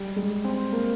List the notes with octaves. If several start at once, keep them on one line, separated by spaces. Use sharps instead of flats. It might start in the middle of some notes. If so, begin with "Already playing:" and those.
Already playing: G3
G#3
C4
A#3